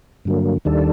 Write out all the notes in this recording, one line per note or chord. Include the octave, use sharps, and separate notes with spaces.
G2 D3 F#3 A#3
D#2 D#3 G3 D4 A4